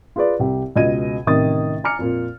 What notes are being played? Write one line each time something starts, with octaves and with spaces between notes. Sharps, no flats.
F4 G#4 B4 D5
C2 G4
C#2 B2 D#5 G#6 D#7
A1 C3 D#3 D#6 A6
G#5 A#5 D6 F6 C#7
F2 A#2